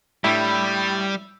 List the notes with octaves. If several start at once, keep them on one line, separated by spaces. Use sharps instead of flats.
A2 G3 D4 E4 B5 E6